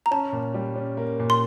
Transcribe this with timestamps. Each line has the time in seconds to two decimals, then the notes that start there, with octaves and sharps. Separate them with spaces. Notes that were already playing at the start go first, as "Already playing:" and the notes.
0.06 A#5
0.11 C#4 A5
0.33 A#2
0.54 G3
0.76 C#4
0.97 A#3
1.20 A#2
1.30 C6